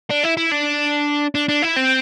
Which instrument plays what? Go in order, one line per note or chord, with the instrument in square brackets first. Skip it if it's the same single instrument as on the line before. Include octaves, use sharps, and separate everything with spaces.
[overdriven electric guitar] D4
E4
E4
D4
D4
D4
E4
C4